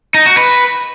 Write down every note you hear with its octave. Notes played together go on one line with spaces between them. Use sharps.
D#4
F#4
B4